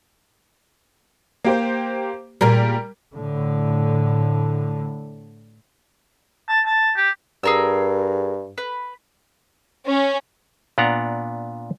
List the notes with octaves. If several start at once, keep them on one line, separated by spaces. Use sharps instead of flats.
A#3 G4 C5
A#2 G3 G#4 A#4
A2 D3
A5
A5
G4
G2 G#4 A#4 E6
B4
C#4
A#2 B3 D4 F#5 A#5